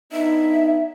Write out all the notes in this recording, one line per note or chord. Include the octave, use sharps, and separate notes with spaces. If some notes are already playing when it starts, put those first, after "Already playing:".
B3 D4 D#4 E5